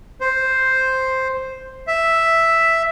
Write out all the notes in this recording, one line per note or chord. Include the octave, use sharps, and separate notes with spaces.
C5
E5